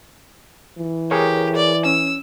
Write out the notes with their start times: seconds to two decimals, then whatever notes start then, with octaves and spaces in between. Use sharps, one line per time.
0.78 E3
1.11 G4 G#4 A#4 C#5
1.56 D5
1.85 C#4 E6